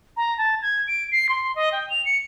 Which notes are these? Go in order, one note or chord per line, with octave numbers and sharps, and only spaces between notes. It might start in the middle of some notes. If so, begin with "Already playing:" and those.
A#5
A5
G#6
D7
C7
C6
D#5
G5
F7
C#7